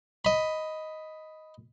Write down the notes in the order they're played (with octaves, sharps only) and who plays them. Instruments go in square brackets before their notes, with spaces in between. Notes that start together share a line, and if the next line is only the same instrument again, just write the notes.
[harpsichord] D#5 B5